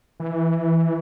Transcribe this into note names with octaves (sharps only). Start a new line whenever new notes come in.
E3